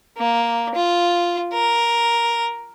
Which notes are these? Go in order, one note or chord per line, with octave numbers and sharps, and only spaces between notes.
A#3
F4
A#4